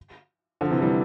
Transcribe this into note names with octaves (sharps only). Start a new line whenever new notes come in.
D3 F3
C3 E3
E3 G3